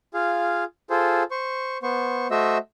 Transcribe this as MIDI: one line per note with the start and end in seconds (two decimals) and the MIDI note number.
0.14 0.64 65
0.14 0.64 68
0.14 0.64 77
0.90 1.23 65
0.90 1.23 68
0.90 1.23 69
0.90 1.23 72
1.31 1.78 72
1.31 1.78 85
1.83 2.28 59
1.83 2.28 72
1.83 2.28 85
2.31 2.58 57
2.31 2.58 66
2.31 2.58 72
2.31 2.58 75
2.31 2.58 76
2.31 2.58 88